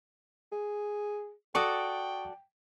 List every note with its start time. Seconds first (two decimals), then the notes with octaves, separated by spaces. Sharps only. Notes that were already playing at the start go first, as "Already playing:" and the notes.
0.52 G#4
1.55 F#4 A4 D5 G5 C#6 D#6